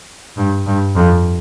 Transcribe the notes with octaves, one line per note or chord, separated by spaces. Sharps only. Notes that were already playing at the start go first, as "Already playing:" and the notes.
G2
G2
F2